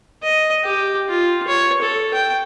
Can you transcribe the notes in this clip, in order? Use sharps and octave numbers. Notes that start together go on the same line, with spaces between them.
D#5
G4
F4
C#5
A4
G5